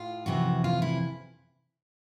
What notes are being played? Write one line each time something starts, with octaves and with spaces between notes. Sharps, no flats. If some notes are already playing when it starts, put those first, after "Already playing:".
Already playing: A2 F4
F2 C3 E3 F#4
F4
E4